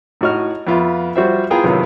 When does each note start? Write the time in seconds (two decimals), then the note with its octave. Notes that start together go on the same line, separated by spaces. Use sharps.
0.21 A2 D#4 F#4 D#5 F6
0.67 F2 B3 F4 E5
1.16 F3 G3 F#4 C5 E5
1.50 B3 E4 F4 G#4 G5 A#5
1.63 A1 F#2 C3 D#3 B3 F4